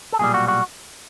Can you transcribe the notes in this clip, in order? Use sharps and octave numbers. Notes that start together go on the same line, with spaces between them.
A4
B1 A#2 G3 G#4
F#4
F#4